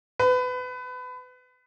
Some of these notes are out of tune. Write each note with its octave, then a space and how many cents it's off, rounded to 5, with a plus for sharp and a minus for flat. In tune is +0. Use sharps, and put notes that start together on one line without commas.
B4 +25